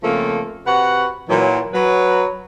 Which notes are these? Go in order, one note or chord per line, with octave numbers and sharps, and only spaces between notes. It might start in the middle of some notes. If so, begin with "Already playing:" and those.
C#3 F3 A3 A#3 C4 A4
C3 F#4 B4 F#5
A#2 E3 F#3
F#3 B4